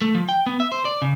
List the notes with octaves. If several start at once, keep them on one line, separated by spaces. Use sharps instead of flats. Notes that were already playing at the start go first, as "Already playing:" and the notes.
A3
F3
G5
B3
E5
C5
D5
C#3